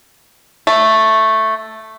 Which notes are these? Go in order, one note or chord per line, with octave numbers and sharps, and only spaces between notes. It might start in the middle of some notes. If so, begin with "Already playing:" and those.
A3